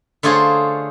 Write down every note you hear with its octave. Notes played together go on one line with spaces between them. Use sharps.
D3 A3 F4 G#4 C5 C#5